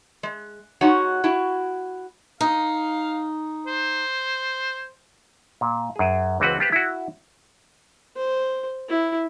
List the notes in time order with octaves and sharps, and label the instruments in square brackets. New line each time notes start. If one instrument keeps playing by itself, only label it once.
[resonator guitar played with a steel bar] G#3
G#3 D#4 F#4 C#5 F#5
E4 F#4
[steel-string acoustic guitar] D#4 [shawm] F5
[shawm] C5
[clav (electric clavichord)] A#2
F#2 G#4
C#2 E3 C4 F#4 B4
F4 G4 B4 C5
E4 F#4
[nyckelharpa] C5
E4